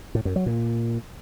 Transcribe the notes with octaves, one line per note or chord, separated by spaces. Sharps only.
A2
F#2
F#3
A#2